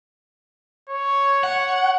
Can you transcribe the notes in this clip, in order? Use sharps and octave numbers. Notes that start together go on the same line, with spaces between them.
C#5
F#5